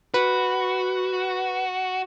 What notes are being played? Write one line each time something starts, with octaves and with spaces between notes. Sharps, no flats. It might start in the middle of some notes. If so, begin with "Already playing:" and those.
F#4 B4